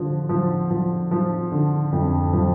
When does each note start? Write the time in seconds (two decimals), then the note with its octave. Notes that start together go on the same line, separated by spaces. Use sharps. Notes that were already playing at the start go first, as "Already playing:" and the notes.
Already playing: D3 F3
0.29 F3
0.70 F3
1.11 F3
1.52 D3
1.92 F2
2.33 F3